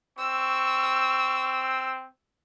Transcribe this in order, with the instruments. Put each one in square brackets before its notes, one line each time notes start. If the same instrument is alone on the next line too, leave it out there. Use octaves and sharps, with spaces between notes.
[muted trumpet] C4 [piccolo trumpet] C#6 [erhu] E6